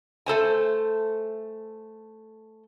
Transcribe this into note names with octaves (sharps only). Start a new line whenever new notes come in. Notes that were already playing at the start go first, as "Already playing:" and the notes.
A3 A4 C5 G#5